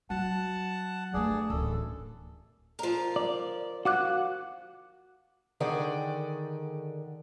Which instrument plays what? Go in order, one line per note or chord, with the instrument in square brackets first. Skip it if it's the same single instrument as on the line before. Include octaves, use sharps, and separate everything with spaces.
[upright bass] F#3 [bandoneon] F#5 A5
[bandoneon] G2 G#4 D5 [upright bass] F3 A3
[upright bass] D1 E3 [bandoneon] F#2 A4
[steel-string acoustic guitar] F3 A#4
[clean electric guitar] D5
[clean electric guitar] F#4 [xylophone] F5 D6 F#6
[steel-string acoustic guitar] D3 D#3 G#4 D5 F#5 G5